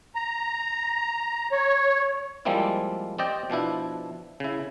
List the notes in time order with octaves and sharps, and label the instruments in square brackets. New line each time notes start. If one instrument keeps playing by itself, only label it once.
[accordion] A#5
C#5
[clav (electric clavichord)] F3 G3 G#3 A#3 C4 E4
C4 G4 D5 D#5 G5
B2 F3 D4 E4
C#3 E4